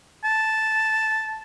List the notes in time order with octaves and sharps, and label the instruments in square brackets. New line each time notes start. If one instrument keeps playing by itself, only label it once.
[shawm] A5